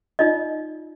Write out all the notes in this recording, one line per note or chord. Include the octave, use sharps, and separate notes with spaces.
D#4 F4 D5 D#5